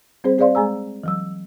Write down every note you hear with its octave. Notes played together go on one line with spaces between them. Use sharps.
G3 C4 G#4 C5
C4 G#4 C5 D5 F5 C6
G#3 G#4 G#5 A#5 E6
E3 F#3 E6